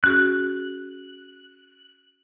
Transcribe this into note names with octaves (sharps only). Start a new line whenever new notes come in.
C#4 F#4 G#4 F#6